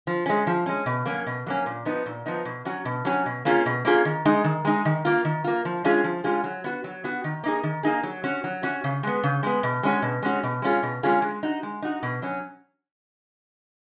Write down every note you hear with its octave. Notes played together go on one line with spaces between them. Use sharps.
F3
G#3 C#4
F3
G#3 C#4
B2
F#3 A#3 C#4
B2
F#3 A#3 C#4
A#2
F3 B3 D#4
A#2
F3 B3 D#4
B2
F#3 C#4 F#4
B2
F#3 C#4 F#4
B2
A#3 C#4 F4 G#4
B2
A#3 C#4 F4 G#4
D#3
G#3 D#4
D#3
G#3 D#4
D#3
A#3 F4
D#3
A#3 F4
F3
G#3 C#4 F4 G#4
F3
G#3 C#4 F4 G#4
F#3
B3 F#4
F#3
B3 F#4
D#3
A#3 D#4 G#4
D#3
A#3 D#4 G#4
F#3
C#4 F#4
F#3
C#4 F#4
C#3
G#3 B3
C#3
G#3 B3
B2
G#3 C#4 F#4
B2
G#3 C#4 F#4
B2
G#3 C#4 F4 G#4
B2
G#3 C#4 F4 G#4
G#3
D#4 F#4
G#3
D#4 F#4
B2
F#3 C#4